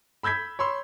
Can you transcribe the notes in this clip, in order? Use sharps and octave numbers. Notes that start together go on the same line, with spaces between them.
B5 E6 G6 G#6 B6
C#5 B5 C6 E6